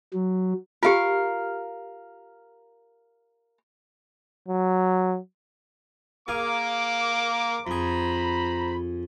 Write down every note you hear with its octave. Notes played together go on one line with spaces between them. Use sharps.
F#3
F4 G4 A#4 F5
F#3
A#3 G#4 F5 D6
F2 G#4 C5 A#5 B5